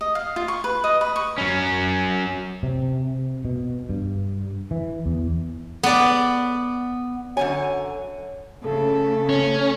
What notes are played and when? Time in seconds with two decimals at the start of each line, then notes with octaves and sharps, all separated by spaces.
0.01 D#5
0.15 F5
0.36 F4
0.48 C#6
0.64 B4
0.84 D#5
1.01 B4
1.16 C#6
1.38 F#3 C#4
2.63 C3
3.45 B2
3.89 G2
4.71 E3
5.06 E2
5.83 B3 D5
7.37 F#2 D3 F#3 G#5
8.64 C#3 A3 A4
9.29 C#4